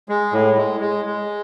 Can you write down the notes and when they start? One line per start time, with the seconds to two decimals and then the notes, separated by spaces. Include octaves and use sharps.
0.09 G#3
0.33 A2
0.57 G#3
0.81 G#3
1.06 G#3